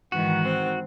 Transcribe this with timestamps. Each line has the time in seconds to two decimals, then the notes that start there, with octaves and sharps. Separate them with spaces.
0.12 G#2 D#3 E3 F#4 F#5
0.44 C4